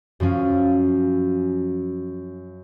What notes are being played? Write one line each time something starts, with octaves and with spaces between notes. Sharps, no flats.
F#2 F3 C#4 F5